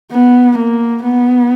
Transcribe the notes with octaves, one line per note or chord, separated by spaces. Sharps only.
B3
A#3
B3